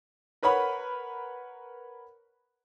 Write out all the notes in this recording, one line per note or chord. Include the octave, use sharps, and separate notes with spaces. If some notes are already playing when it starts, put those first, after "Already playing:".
A#4 B4 C#5 F#5 B5